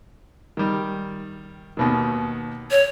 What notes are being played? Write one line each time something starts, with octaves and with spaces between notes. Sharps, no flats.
D#3 G3
D#2 B2 D#3
C#5